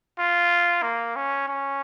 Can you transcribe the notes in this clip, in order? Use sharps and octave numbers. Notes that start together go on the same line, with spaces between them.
F4
A#3
C#4
C#4